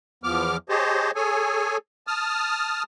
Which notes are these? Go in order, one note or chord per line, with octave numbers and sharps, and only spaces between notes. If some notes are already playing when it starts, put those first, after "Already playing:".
E2 F3 B3 D6 F6
G4 G#4 C5 C#5 D#5 A5
G#4 A4 C#5 G#5
A5 D#6 F6